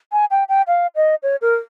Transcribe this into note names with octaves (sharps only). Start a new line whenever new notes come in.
G#5
G5
G5
F5
D#5
C#5
A#4